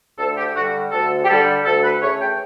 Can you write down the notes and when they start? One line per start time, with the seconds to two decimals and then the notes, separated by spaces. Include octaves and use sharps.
0.18 D2 A4
0.37 G4
0.55 D3 F#4
0.58 G3
0.92 D2 A4
1.24 G4
1.28 D3 G3 A4
1.65 D2 A4
1.84 B4
2.02 C#3 E3 A3 C#5
2.20 G5